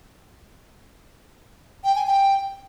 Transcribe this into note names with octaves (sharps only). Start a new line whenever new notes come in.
G5
G#5
G5